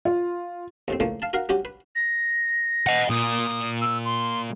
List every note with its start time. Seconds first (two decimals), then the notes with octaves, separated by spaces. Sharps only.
0.05 F4
0.88 D#2 A2 C4
1.00 C#2 A2 F3 A3 A#3
1.22 F5 A5
1.33 F#4 A#4 F5 F#5
1.49 G3 C#4 F#4 G4
1.65 B4
1.96 A#6
2.86 D#5 F#5
3.10 A#2 D#6
3.81 E6
4.05 C6